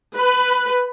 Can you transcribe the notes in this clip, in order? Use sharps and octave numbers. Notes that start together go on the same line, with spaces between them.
B4